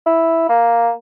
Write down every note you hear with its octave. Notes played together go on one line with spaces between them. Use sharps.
E4
A#3